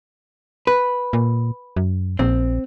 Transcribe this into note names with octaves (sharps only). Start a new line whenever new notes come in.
B4
A#2
F#2
A#1 C4